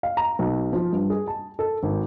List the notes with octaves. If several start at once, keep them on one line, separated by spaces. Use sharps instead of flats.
F5
A#5
B1
F3
G2
G#4
A5
A4
G#1